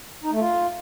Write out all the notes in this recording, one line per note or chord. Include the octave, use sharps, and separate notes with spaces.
D#4
A3
F4